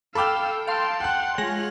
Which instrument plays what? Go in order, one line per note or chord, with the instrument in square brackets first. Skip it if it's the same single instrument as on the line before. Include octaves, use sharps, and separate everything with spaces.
[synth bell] A4 G5 [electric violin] F5 E6 [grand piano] B5 D6 F6
[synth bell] F5 C6 [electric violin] G5 A5
[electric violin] F#5 [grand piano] G5 F#6
[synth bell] G#3 A#6 F#7 [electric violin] F4 C#5